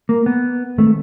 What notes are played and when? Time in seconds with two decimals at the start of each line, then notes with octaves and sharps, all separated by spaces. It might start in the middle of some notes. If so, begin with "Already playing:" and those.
0.09 A#3
0.26 B3
0.78 D#3 G#3 A3 C4